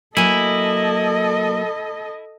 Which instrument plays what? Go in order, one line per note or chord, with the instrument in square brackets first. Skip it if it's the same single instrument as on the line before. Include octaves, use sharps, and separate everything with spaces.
[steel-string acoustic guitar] F#3 A#3 [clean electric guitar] E4 G#5 [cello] A4 D#5